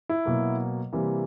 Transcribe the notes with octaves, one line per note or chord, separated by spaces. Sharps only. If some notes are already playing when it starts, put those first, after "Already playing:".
E4
B2 F#3 A#3
C3 E3 G3 A#3